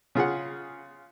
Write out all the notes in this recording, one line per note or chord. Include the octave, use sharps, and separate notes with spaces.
C#3 F4 G#4 F#5